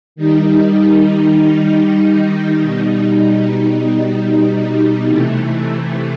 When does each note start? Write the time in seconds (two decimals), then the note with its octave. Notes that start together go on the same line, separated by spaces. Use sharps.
0.16 D#3 G3 D#4
2.62 B2 G3 D#4
5.07 C3 E3 A3